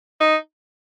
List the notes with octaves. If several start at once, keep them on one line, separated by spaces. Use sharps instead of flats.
D#4